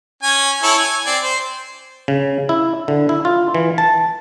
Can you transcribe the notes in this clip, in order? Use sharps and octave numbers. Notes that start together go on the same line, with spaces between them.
C#4 G#5
E4 A4 C#5
G#5
C4 D5
C5
C#3
E4
D3
E4
F4
E3
A5